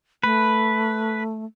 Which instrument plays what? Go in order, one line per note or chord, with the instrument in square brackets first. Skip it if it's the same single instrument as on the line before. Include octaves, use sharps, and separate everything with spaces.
[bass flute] A3 [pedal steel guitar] B4